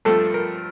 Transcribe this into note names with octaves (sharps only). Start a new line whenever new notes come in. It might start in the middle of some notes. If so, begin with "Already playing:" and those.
G2 F3 A3 C4 A4
A#4